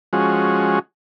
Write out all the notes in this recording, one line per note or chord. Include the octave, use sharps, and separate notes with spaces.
F3 G#3 C#4 F#4